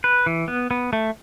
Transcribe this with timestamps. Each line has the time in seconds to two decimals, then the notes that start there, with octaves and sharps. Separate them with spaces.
0.04 B4
0.26 E3
0.48 B3
0.71 B3
0.93 A3